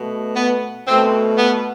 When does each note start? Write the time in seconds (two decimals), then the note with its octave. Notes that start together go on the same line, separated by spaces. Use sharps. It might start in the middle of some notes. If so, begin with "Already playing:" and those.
Already playing: B2 A3
0.36 B3
0.88 B2 A3 C4
1.38 B3